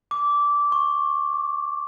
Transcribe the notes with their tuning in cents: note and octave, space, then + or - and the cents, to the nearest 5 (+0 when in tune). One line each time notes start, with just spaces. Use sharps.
D6 -15
C#6 -30
D6 +15